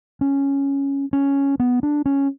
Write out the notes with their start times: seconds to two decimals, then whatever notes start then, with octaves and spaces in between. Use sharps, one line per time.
0.21 C#4
1.13 C#4
1.60 B3
1.83 D4
2.06 C#4